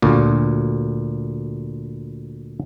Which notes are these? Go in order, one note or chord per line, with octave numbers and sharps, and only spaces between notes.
D2 A#2